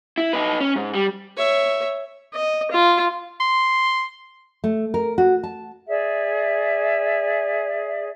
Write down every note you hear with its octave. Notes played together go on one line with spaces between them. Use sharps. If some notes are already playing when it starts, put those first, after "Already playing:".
E4
D#4 B4
C#4
G#2
G3
C#5 E5
D#5
F4
C6
A3
A#4
F#4
A5
G#4 D5 E5